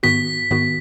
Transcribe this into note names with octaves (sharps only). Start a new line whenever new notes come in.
G#2 D#3 B3 F#4 B6
G#2 D#3 B3 F#4